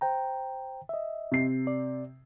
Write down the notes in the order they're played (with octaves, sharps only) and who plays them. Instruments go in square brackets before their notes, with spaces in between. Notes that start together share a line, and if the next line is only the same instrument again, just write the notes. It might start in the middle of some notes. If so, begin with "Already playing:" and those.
[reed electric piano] C5 G5 A#5
D#5 E5
[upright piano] C3 C7
[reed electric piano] D5